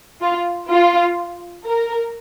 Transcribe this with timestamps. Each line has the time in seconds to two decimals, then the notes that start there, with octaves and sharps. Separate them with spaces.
0.21 F4
0.70 F4
1.66 A#4